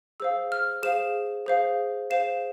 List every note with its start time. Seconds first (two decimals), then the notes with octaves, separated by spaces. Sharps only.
0.20 G#4 C5 F5 E6
0.52 F6
0.83 G#4 C5 F5 E7
1.46 G#4 C5 F5
2.10 G#4 C5 F5 E7